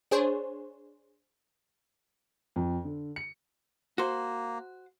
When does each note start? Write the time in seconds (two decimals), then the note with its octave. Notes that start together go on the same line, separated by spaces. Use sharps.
0.11 D4 G#4 C5 C#5
2.56 F2
2.85 D3
3.16 C#7
3.98 A#3 F#4 C5